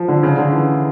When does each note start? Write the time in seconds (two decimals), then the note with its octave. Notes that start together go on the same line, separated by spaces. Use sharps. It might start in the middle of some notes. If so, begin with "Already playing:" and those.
Already playing: F3
0.08 D3
0.23 C#3
0.38 D3
0.53 E3